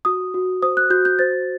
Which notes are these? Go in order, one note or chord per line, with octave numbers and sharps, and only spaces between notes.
F#4 D#6
F#4
C5 D#6
F#6
F#4 G6
G6
C5 A6